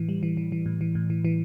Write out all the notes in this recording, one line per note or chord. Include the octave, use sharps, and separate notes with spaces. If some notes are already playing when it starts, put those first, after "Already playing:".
Already playing: A2 E3
G3
E3
E3
E3
A2
E3
A2
E3
E3